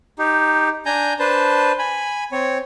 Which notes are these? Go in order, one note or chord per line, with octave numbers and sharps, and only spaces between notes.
D#4 G4
D4 G#5 A#5 G6
D4 B4 C5 A5
G#5 B5
C4 C#5